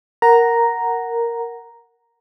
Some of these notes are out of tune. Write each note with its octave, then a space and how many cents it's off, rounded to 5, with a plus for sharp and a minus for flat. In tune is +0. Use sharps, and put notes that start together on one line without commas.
A#4 +0 F#5 +0 A#5 +0